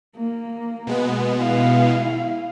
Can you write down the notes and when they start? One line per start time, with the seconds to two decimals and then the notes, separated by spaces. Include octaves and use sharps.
0.16 A#3
0.87 B2 G#3 B3
1.38 E4 F5